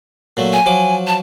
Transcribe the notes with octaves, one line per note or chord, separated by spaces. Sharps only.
A#2 F#3 A3
G#5
F3 F#3 D6
A5